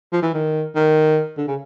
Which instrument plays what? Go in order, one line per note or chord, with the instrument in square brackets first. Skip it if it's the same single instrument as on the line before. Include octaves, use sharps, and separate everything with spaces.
[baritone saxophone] F3
E3
D#3
D#3
D3
C#3